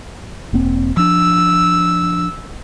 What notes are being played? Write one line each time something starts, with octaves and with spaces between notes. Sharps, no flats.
E1 A#3 C4
F3 D4 E6